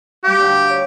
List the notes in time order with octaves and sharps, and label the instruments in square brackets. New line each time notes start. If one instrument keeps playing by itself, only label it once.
[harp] G3 F5 [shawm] G4
[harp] D2 D4
C#5